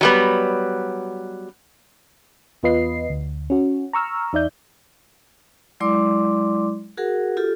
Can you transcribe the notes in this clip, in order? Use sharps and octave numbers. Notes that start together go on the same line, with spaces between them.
F#3 G3 B3
E2 B3 F4 B4 D#5 C7
D2
C#4 F#4
A#5 C#6 E6 F6
E2 D#4 D5 E5 G6
F#3 G#3 E4 D5 C6 D6
F#4 G#4 A#4 F#5
F4 G4 A4